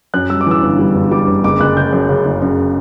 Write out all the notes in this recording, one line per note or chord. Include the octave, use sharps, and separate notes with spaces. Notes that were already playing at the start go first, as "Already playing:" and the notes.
F#2 F#6
G3 E6
D6
E3 E6
G1
G3
G1
G3 D6
G1
F#1 D6
F#1 F#6
C#3 G6
F#2
C#3
F#1
F#2